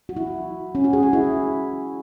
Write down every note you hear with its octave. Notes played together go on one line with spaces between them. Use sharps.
F#4
E4
C#4
F#4
G#4
F#4
E4